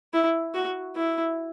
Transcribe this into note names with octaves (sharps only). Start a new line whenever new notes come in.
E4
F#4
E4